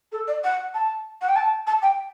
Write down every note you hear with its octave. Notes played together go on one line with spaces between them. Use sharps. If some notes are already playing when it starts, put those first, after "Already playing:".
A4
D5
F#5
A5
F#5
G5
A5
A5
G5